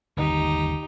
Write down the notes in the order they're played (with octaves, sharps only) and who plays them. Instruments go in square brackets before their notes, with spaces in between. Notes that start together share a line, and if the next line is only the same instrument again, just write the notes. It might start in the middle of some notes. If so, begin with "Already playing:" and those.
[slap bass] G1 D#2 [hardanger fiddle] D#4 G4